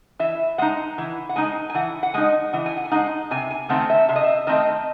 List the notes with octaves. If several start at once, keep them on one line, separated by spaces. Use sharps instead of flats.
E3 E5
G#3 D#4 F#5
E3
F#5
G#3 D#4 G#5
G#5
E3 F#5
F#5
G#3 D#4 G#5
E3 F#5
G#5
F#5
G#5
G#3 D#4 F#5
C3 G#5
G#5
D#3 A3 C4 F#5
E5
C3 E5
D#5
E5
D#3 A3 C4 D#5